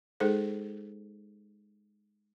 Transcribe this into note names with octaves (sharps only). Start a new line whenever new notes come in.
G#3 D#4 G#4 A4 C5